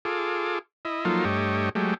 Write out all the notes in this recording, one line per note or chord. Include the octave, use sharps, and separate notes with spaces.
F4 G#4 A4 D6
E4 D#5
F3 F#3 A#3 D#4 F4 A4
G2 A3 G4 C#5 D#5
F#3 G#3 A3 G4